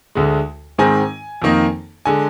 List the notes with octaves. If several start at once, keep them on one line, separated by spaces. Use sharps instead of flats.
D2 D3 G#3
G#2 D#3 G#3 C4 G#5
F2 D#3 A#3 D#4
D3 G#3 G#5